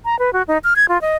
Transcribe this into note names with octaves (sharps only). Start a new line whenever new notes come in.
A#5
B4
F#4
D#4
F6
G#6
F4
D#5